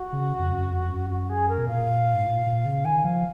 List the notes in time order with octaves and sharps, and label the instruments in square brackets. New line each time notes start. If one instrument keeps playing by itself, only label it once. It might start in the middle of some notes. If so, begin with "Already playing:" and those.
Already playing: [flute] F#4
[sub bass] C#3
F2
F#2
F2
F#2
[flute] F#4
G#4
A#4
[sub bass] B2
[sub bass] A#2 [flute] F5
[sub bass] G#2
A#2
A#2
C#3
[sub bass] D#3 [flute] G#5
[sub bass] F3 [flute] F5